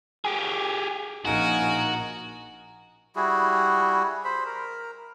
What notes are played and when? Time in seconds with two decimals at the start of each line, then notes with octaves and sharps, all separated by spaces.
0.25 G4 G#4
1.25 A#1 C#3 D#4 F#4 A#4 G#5
3.16 G3 E4 F#4 G#4
4.25 C5 B5
4.45 A#4